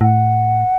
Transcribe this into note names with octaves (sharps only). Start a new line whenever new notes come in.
A2 F#5